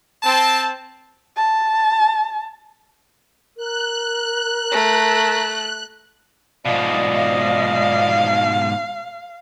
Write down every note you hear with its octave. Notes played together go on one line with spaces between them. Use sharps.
C4 A5
A5
A#4 F#6
A3 A#5
G#2 B2 F3 D5 D#5 F5
F5